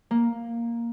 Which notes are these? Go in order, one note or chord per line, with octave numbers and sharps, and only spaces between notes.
A#3